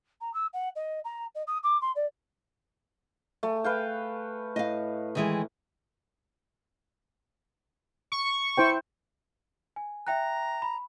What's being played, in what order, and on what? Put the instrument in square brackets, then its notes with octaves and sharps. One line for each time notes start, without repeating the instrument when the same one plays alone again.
[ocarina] A#5
E6
F#5
D#5
A#5
D#5
D#6
D6
C6
D5
[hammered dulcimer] A3 G#5
B4 F5 G5
[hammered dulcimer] A2 [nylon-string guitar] D#5 F5
[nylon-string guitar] D#3 E3 G#3
[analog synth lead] C#6
[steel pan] E4 C5 G5
[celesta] G#5
[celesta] E5 G5 F#6 [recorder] A#5
[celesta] B5